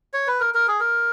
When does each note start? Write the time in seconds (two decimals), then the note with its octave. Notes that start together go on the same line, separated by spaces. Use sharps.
0.13 C#5
0.27 B4
0.40 A#4
0.54 A#4
0.68 G#4
0.80 A#4